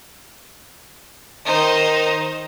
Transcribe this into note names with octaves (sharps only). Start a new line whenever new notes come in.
D#3 D#4 C5